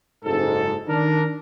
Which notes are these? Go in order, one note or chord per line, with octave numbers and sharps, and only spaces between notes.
F#1 G#2 A4
D#3 D4 A#4